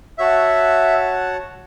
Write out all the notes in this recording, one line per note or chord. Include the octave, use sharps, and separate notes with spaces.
F#4 C#5 E5 F#5 A5